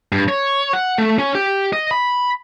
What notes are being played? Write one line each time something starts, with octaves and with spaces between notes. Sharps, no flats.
G2
C#5
F#5
A3
C#4
G4
D#5
B5